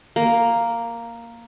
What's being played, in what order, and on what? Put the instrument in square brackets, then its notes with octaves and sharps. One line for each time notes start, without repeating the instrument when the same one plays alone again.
[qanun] A#3